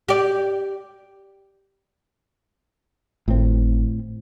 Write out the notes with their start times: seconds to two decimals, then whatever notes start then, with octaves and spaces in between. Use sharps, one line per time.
0.09 G4 D5
3.28 G#1 A2 C4